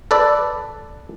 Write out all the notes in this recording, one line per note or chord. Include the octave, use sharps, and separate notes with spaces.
A4 B4 D5